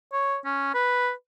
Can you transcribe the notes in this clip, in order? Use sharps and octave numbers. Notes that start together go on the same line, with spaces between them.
C#5
C#4
B4